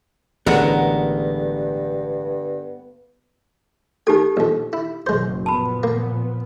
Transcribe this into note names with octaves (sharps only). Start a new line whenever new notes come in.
A1 G2 D3 G#3 A3 B3 A#4 F#5
D#4 G4 A4 A#4 G#5
A#1 F2
E4
F#1 B2 G#3 C5
A#2 F3 B3 A5 B5
A#3